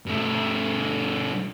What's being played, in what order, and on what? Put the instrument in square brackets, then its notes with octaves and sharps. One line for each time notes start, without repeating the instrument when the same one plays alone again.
[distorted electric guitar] G2 A3